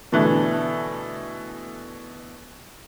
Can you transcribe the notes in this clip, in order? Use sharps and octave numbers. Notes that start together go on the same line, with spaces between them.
B2 D3 E3 A3